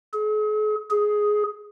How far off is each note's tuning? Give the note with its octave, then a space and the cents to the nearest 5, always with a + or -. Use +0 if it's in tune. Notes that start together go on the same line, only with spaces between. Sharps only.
G#4 +45
G#4 +10